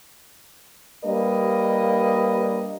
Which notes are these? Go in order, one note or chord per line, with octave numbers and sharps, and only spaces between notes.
G3 A#3 D4 B4 D#5